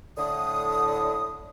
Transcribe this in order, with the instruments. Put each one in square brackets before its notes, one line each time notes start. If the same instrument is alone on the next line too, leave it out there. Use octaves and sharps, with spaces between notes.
[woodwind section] A2 D3 [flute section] D#6